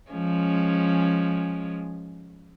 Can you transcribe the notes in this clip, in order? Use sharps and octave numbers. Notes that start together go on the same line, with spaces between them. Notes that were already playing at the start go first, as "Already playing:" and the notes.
F3 G#3 C#4